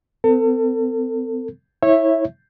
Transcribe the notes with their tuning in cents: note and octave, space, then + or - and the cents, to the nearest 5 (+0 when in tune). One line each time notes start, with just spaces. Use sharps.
C4 -40 A4 +35
E4 -20 C#5 -20 E5 +0